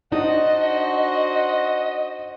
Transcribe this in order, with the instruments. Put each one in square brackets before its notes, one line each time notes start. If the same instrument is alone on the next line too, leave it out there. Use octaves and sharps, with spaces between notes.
[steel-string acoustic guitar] D4 [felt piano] D#4 [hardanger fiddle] F#4 C5 [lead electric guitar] D#5